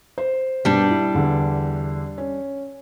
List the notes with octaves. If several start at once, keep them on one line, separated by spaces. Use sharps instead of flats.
C5
G2 B2 G3 D4
E4
E2 D3
C#4